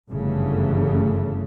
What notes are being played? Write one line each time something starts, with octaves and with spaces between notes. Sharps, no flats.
G1 F#2 C#3 E3 A3